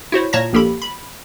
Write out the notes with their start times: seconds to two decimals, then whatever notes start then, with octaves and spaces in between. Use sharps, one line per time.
0.12 E4 F#4 C5 C#5
0.33 A#2 C#5 A5 A#5 A#6
0.53 A#1 A#3 G4 A4 B5
0.82 B5